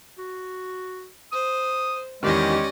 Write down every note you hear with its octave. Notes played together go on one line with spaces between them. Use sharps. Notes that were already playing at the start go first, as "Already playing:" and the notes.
F#4
C5 D#6
E2 D#3 G#3 C#4 G4 D5 D#5